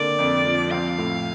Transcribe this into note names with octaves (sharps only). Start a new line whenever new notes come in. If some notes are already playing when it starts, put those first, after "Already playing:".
Already playing: D3 A#3 C4 D5
F2
F3
C4 F5
A2